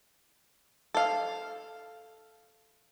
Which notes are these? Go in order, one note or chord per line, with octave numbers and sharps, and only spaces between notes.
A4 F5